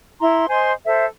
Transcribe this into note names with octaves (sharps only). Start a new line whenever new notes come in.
E4 A#5 C6
C5 D#5 G#5 C6
A4 C5 E5